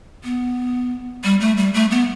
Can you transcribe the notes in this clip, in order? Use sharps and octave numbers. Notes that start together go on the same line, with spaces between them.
B3
G3
A3
G3
A3
B3